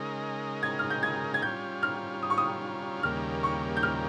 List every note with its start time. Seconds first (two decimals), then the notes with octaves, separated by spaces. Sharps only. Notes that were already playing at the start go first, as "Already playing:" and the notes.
Already playing: C#3 G#3 D#4 A#4
0.63 G#6
0.79 F6
0.90 G6
1.03 G#6
1.34 G#6
1.42 G3 C#4 F4 G6
1.83 F6
2.23 D#6
2.30 C#6
2.38 D#6
3.03 D#2 C#3 G3 A#3 F6
3.43 C#6
3.77 G6
3.83 F6